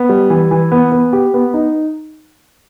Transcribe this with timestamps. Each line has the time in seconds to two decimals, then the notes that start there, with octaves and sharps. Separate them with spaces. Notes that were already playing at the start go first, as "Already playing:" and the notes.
Already playing: B3
0.09 G3
0.30 E3
0.51 E3
0.72 B3
0.92 B3
1.13 G4
1.34 B3
1.54 D#4